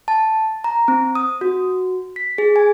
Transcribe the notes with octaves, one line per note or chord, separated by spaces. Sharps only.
A5
A#5
C4
D#6
F#4
B6
G#4
G#5